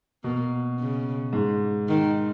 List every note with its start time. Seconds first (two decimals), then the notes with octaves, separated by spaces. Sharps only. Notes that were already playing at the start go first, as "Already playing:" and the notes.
0.24 B2 A#3
0.79 C#3
1.33 G#2
1.88 D#3